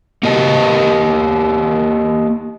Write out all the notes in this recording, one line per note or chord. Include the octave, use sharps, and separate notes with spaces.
A#3 G4 D#5 A5